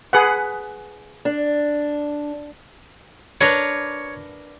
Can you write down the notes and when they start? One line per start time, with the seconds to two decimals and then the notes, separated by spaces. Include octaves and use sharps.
0.13 G#4 B4 F#5
1.25 D4
3.41 D4 A#4 B4 C#5